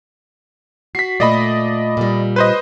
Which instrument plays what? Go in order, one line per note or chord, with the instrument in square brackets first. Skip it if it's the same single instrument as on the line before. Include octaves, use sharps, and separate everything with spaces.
[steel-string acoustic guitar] F#4 [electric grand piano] B6 C7
[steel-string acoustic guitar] A#2 A3 [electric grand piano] D5 D#5 B5
[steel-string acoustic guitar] A#2 G3
[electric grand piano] B4 C5 D#5